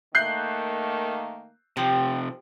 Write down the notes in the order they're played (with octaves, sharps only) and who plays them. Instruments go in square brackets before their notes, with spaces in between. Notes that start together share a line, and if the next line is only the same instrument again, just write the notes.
[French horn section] D#3 A3 A#3 [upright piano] F#6 G6 C7
[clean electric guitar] C3 F3 [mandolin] G4